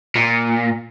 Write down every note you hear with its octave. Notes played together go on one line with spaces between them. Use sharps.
A#2